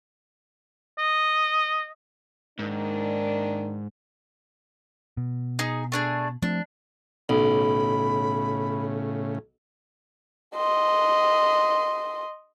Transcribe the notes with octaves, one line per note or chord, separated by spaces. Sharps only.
D#5
G#2 D#3 A#3 D4
B2
D#4 G#4
A3 D4 G#4
F3 A3 C4 D4
B1 A2 C#3 B5
D#5 C6